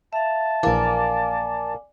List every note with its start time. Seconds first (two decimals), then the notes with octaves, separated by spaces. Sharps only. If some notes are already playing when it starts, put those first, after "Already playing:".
0.13 E5 F5 A5
0.63 A#1 E3 A#3 D5 G#5 D6